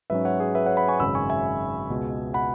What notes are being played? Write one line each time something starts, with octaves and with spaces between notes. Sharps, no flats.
G#2 F#3 C#4 B4 E5
C#5 F#5
G#4 C#5
B4 E5
C#5 F#5
F#5 B5
G#5 C#6
G#1 F#2 C#3 G#3 B5 E6
G#5 C#6
E5 G#5
C#2 B2 G#3
F#5 B5